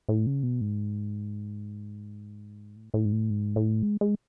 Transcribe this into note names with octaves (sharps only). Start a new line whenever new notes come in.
A2
C#3
B2
G#2
A2
A2
G#2
A2
G#2
A2
G#3
G#3